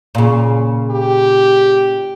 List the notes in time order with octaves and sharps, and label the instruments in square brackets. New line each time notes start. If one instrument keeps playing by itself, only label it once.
[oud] A#2 C#3
[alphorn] G4